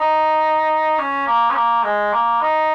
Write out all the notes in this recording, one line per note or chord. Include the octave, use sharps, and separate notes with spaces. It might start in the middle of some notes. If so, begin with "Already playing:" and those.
Already playing: D#4
C#4
A#3
C#4
A#3
G#3
A#3
D#4